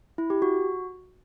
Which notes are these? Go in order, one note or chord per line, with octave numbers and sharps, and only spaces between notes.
E4
G4
F#4